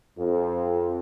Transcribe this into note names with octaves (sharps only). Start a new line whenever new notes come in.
F2